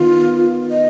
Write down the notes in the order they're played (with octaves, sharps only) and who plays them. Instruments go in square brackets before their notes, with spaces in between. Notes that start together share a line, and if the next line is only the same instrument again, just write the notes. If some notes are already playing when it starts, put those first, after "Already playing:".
Already playing: [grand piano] D#3 B3 [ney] F4
[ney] D#5